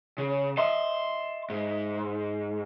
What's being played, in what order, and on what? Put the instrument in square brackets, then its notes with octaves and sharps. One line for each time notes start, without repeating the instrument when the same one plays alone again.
[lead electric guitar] C#3
[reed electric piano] D#5 E5 [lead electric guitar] A5 C6
[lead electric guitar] G#2